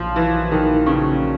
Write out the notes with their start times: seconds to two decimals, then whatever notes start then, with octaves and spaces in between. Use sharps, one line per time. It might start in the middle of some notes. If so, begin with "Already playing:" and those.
Already playing: A#1 A#2 F3 F#3
0.16 E3
0.52 D#3
0.86 C#3